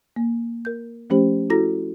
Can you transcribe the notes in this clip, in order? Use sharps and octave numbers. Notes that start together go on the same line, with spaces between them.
A#3
A#4 G6
F3 A3 C#4 G4 C5
E4 F#4 A4 A#5 A#6